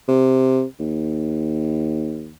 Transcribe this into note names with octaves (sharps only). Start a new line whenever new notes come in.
C3
D#2